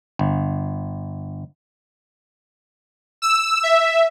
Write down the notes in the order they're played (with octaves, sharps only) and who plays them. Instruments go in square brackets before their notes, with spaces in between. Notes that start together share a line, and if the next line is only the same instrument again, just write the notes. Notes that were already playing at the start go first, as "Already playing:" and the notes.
[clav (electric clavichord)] G1
[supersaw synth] E6
E5